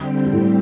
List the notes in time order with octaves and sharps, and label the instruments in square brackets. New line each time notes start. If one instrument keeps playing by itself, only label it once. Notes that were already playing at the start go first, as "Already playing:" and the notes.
Already playing: [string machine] D3 G3 C4 G4
[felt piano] G3
A2 A3